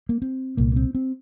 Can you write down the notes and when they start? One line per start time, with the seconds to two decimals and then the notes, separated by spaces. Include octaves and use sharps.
0.09 A#3
0.22 C4
0.57 C2 A#2 A#3
0.72 A#3
0.76 C4
0.95 C4